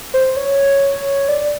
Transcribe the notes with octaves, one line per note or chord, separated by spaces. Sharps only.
C5
C#5
D5